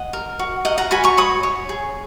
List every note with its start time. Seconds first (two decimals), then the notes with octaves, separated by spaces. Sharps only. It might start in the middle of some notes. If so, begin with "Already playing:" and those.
Already playing: D#5 F#5
0.13 A#4
0.39 F#4
0.65 A#4 D#5 F#5
0.78 F#5 A#5
0.91 F#4 G#5 B5
1.04 A#5 C#6
1.17 C#5 B5 D#6
1.43 C#5
1.69 G#4